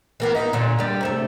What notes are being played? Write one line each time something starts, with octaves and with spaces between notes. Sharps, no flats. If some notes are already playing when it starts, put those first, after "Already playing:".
E3 A#3 B3
D#4
A#2 D3
G3 D5
C3 A3 A4